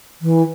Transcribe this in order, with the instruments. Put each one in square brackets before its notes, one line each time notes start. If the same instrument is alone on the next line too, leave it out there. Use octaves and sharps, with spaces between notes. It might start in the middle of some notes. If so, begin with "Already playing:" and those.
[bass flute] E3